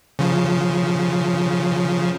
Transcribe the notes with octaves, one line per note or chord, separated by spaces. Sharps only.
C#3 F3